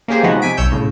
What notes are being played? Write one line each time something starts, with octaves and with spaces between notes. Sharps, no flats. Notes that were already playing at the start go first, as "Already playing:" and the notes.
A#3 C#4 G4 G#4 C5
C3 F3 G#3 B3 D#4 F#4
C3 G#5 B6 D7
B1 C#5 E6 G6
C2 A2 C#3